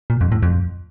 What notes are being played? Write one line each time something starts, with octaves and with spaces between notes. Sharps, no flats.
A#2
F2
A2
F2